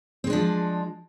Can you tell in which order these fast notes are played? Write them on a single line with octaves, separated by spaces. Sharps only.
C4 G#3 D4 F3